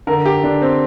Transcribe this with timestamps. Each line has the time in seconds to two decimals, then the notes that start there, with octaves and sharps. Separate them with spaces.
0.07 D3 A#4
0.25 G4
0.44 D3 D4
0.62 C4